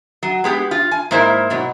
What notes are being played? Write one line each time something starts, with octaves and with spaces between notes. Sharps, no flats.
F#3
G#3 B3 G4
F4
G#5
G#2 A#3 E4 A#4 C5
G#2 B2 F#3